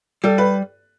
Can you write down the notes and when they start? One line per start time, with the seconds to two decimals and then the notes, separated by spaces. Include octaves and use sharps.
0.24 G3 A4
0.38 B4